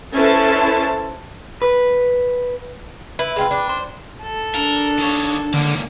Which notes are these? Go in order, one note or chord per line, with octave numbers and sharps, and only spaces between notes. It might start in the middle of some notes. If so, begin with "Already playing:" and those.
C#4 E4 A4 B4 C5 A5
B4
E4 B4
G#3 C4 F4
D4
C5
A4
D4 A#4
D#3 C#5
C#2 D3 A#3